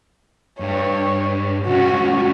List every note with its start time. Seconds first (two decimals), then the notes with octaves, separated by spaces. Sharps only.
0.60 G2 C#5
1.67 C2 C#4 F#4